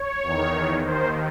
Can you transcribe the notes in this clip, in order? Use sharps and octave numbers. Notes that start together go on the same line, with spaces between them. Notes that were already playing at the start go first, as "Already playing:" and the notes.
Already playing: C#5
E2 D#3
D#2 D#3 C5